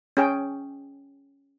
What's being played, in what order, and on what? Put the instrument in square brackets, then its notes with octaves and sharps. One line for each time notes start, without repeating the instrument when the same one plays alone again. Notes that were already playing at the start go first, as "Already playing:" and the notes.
[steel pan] C#4 G#4 G5